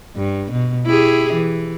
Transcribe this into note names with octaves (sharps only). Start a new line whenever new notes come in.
G2
B2
E4 G4 G#4
E3